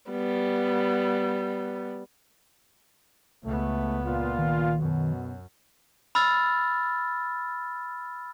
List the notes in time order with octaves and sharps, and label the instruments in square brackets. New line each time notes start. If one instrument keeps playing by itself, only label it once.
[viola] G3 B3
[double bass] C#2 B3 [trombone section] A3
[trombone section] A#2 F4
[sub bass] D#3
[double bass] F#2 [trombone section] B2
[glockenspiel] B5 E6 F6 A6